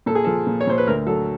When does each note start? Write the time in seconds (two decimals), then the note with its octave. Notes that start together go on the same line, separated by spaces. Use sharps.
0.06 A#2 A4
0.15 G#4
0.24 F3 A4
0.47 A#2
0.61 C#5
0.67 A#2 C5
0.78 B4
0.87 D2 A#4
1.06 F#3 A4